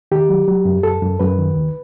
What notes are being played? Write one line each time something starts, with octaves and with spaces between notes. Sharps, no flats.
D#3 G4
F#3
F#3
F#2
F#2 A4
F#2
F#2 B4
D#3
D#2